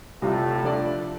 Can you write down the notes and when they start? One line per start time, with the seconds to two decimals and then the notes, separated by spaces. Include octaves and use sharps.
0.22 A2 C3 G3 A3 F4
0.64 F3 D4 A4 D5